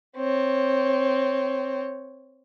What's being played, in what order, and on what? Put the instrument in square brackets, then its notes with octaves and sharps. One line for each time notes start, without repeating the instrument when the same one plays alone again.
[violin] C4 C#5